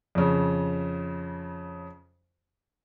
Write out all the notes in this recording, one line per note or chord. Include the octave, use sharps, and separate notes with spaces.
F2 C#3